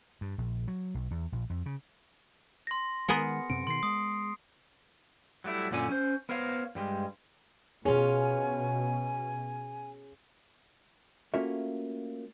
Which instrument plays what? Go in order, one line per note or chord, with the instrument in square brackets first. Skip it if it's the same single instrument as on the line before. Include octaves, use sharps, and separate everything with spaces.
[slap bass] G2
A#1
F#3
B1
E2
A#1
F2
C#3
[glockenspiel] C6 A#6
[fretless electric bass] D#3 G#3 [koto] B3 G#4 A#4 [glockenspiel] C#7
[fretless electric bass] F#2 C3 C4 [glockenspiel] D7
[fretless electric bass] B2 D#3 [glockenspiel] C6 C7
[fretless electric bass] G#3 [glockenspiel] D#6
[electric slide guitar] F#3 G3 A3 E4
F#2 A#2 D3 C#4 G#5
C#4 C5
B3 A#4 C5 C#5 F5
G2 G3 G#3
[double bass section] B2 [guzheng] C#4 F4 [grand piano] G#4 [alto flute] G#5
[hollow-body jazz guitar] A3 A#3 C#4 F4 F#4 E5